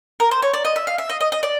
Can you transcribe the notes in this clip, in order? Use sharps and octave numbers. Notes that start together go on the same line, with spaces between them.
A#4
C5
C#5
D5
D#5
E5
F5
E5
D#5
D#5
D#5
D5